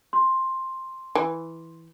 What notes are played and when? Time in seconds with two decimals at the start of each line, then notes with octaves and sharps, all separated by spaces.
0.13 C6
1.15 E3